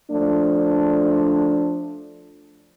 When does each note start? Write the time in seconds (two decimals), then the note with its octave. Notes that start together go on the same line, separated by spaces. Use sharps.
0.10 F3 A3 D4